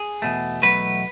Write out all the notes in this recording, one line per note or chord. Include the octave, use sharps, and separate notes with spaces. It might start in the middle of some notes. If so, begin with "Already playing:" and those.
Already playing: G#4
E2 B2 A3
E2 B2 F#3 A3 B4